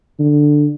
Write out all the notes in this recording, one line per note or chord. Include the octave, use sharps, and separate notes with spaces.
D3